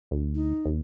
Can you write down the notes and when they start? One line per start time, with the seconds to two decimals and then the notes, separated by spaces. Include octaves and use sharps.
0.11 D2
0.35 D#4
0.65 D#2